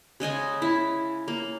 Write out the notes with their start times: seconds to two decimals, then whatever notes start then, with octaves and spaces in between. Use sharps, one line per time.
0.20 C#3 G#3 D#5 G#5
0.62 E4
1.28 A#3